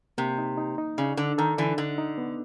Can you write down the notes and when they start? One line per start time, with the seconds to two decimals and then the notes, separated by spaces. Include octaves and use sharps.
0.18 C3 A#3
0.38 D#4
0.58 D#4
0.78 D#4
0.98 C#3 D5
1.17 D3 A4
1.38 D#3 A4
1.58 D3 E3 D5
1.78 D3 D#4
1.98 D#4
2.18 B3